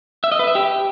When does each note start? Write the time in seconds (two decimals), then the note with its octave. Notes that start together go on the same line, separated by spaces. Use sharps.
0.24 E5
0.32 D#5
0.39 B4
0.47 E5
0.55 G4